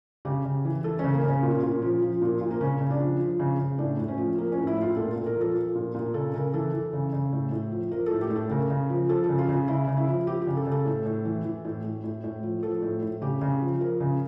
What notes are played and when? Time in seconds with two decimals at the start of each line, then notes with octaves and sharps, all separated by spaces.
0.25 C#3 G4
0.45 C#3
0.65 E3
0.84 E3 A4
0.99 C#3 C#4
1.13 A#3
1.23 C#3 C#4
1.43 A#2
1.63 A#2
1.82 F3
2.02 F3
2.22 A#2
2.41 A#2
2.51 A#3
2.61 C#3 C#4
2.80 C#3
2.90 D4
3.00 F3
3.20 F3
3.39 C#3
3.59 C#3
3.79 A2 D4
3.98 A2
4.08 C#4
4.18 F3
4.38 F3 A#3
4.52 C#4
4.57 A2
4.67 E4
4.77 A2 F4
4.96 A#2 A4
5.11 A#2 A4
5.26 A#4
5.36 F3 A4
5.55 F3
5.75 A#2
5.95 A#2
6.14 C#3 A4
6.34 C#3 A#4
6.54 E3 A4
6.73 E3
6.93 C#3
7.13 C#3
7.33 A2
7.52 A2
7.71 F3
7.91 F3 A#4
8.06 A2 A4
8.21 G4
8.30 A2
8.36 A4
8.50 C#3 A#4
8.70 C#3
8.90 F3
9.09 F3 A4
9.24 C#3 A4
9.39 F4
9.49 C#3
9.68 C#3 E4
9.87 C#3
9.97 E4
10.07 F3
10.27 F3 G4
10.42 G4
10.47 C#3
10.56 A4
10.67 C#3
10.72 A4
10.86 A2
11.06 A2
11.25 E3
11.45 E3
11.65 A2
11.84 A2
12.04 A2
12.24 A2
12.43 F3
12.63 F3 A4
12.82 A2
13.02 A2
13.21 C#3 G4
13.41 C#3
13.61 F3
13.80 F3 A#4
14.00 C#3